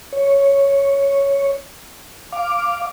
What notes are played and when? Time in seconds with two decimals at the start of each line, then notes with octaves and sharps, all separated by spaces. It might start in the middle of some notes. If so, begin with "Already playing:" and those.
0.12 C#5
2.32 F5 D6